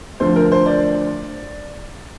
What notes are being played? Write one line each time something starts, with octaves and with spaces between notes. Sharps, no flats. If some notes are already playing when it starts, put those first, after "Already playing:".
D2 D3 F3 C5
A#4
C5
D5